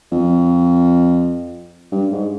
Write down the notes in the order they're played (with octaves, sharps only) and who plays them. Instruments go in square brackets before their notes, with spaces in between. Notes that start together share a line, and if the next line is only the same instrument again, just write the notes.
[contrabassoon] F2
G2
G#2